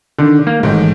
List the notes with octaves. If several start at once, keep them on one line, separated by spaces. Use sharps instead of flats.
D3 D#3
A#3
A1 G#2 D#3